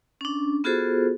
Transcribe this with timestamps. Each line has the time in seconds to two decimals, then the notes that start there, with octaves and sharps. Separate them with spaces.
0.21 C#4 D4
0.64 B3 F4 F#4 G#4 A4 C5